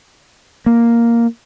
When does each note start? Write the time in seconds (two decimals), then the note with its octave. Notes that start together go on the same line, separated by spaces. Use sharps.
0.66 A#3